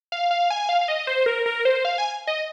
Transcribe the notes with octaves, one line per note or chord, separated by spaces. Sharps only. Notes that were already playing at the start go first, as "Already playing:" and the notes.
F5
F5
G#5
F5
F5
D#5
C5
A#4
A#4
C5
F5
G#5
D#5